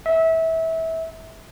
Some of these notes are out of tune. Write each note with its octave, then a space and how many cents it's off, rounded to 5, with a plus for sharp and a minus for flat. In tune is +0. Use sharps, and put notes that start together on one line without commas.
E5 -25